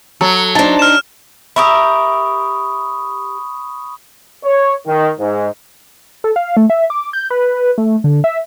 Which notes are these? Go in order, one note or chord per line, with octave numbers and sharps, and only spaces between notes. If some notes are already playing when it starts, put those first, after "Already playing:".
F#3 A4
D4 D#4 C5 A5
F6 E7
G4 A#4 E5 B5 C#6 D#6
C#5
D#3
G#2
A4
F5
A3
E5
D6
G6
B4
A3
D3
E5